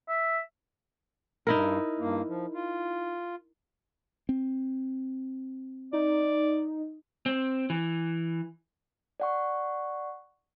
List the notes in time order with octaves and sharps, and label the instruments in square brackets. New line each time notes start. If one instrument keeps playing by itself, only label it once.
[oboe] E5
[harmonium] G2 [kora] D#4 E4 A#4
[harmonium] G2 A#3
F3
F4
[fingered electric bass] C4
[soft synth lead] D#4 [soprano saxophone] D5
[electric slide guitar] C4
E3
[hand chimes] D5 F#5 C#6